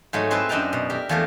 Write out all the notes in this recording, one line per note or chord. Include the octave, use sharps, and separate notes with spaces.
G#2 F#3 A3 D#4
G#3 C4 E4 B4 A5
F#2 D4 D#4 G5 A5 A#5
B2
G4 A#4 E5
E2 F3 A3 A#3 A#4